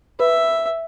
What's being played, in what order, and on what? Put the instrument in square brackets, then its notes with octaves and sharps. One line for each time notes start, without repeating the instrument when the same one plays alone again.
[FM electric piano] B4 [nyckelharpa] E5